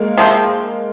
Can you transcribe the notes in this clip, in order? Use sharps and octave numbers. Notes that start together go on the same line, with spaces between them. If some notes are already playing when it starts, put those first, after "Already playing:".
Already playing: G#3 A#3
C3 F3 A3 C4